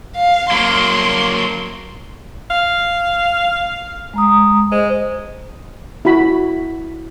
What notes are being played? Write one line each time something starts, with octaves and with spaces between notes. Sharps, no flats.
F5
F#3 A#3 C6
F5
G#3 A#5 D#6
G#3 C5
E4 F#4 B5